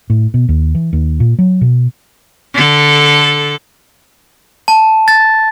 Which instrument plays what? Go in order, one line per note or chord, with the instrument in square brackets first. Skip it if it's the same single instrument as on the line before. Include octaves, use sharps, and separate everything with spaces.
[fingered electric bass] A2
B2
D#2
E3
D#2
A#2
F#3
B2
[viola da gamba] D3 A4
[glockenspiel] A5
A6